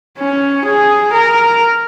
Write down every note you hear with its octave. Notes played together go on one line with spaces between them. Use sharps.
C#4
G#4
A#4